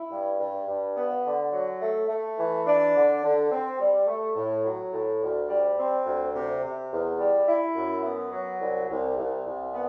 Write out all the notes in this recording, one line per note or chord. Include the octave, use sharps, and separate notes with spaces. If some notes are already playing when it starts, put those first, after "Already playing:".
Already playing: E4
G2
G2
G2
B3
D3
F#3
A3
A3
E3
D4
D3
D3
C4
G3
A3
A2
F#3
A2
D2
G3
C4
D2
C3
C3
E2
G3
E4
F#2
B3
F#3
C2
C2
C2
C2
B3